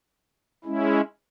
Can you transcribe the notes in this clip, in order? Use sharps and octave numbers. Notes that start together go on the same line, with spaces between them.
G#3 C#4 E4